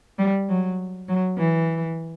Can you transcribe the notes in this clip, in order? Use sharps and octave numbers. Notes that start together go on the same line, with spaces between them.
G3
F#3
F#3
E3